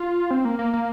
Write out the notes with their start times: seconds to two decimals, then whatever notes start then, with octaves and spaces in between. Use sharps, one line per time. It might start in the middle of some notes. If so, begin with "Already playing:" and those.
Already playing: F4
0.31 C4
0.45 A#3
0.59 A#3
0.74 A#3